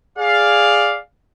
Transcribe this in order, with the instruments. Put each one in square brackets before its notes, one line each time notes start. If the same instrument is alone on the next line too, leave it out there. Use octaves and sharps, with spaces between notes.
[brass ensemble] G#4 D5 F5